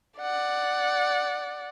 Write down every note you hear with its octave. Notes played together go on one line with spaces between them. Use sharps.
D5 F#5